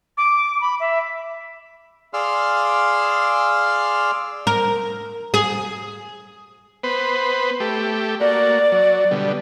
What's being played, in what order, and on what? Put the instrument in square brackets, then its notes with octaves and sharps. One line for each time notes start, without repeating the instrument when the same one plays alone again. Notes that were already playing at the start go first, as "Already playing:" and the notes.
[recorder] D6
B5
E5
[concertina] G#4 D5 F5 C6 E6 F6
[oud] A#4
G#4
[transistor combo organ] B3 B4 C5
A3 G4
[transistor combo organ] A#3 F#4 [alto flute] D5
[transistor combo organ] F#3
B2 D3 G3